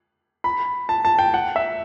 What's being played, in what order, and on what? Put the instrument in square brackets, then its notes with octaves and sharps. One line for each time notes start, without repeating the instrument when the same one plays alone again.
[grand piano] B5
A5
A5
G5
F#5
E5